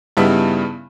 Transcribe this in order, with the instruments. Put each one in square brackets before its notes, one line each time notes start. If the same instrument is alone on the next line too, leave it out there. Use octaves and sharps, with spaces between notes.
[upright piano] G2 C#3 G3 B3 D#4 E4